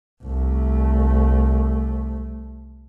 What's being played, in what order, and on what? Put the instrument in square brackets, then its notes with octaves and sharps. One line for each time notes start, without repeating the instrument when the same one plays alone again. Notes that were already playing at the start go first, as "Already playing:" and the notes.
[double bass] C2 A3